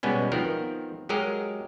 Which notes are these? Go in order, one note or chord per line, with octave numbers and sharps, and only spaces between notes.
B2 G3 G#3 B3 C#4
D#3 F3 B3 C4 A#4
F#3 G#3 G4 G#4 A#4 D#5